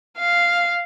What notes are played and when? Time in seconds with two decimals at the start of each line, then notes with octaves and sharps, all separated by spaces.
0.18 F5